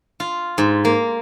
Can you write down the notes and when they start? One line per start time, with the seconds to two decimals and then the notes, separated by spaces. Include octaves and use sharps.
0.20 F4
0.58 G#2
0.85 A#3